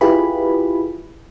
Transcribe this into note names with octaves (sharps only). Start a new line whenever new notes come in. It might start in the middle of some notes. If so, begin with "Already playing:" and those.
E4 F4 G4 G#4 B4 B5